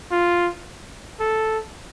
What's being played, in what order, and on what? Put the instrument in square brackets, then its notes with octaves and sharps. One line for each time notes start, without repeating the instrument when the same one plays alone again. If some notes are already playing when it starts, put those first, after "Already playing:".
[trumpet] F4
A4